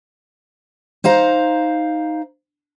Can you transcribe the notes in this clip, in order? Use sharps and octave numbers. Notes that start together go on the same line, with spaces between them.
D#4 C5 F5 A#5